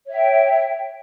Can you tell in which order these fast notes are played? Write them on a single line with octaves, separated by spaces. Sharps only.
C#5 E5 G5